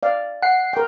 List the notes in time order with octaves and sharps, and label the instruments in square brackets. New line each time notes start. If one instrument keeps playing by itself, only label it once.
[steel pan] D5 F5
[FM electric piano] F#5 C7
[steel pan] A#4 G5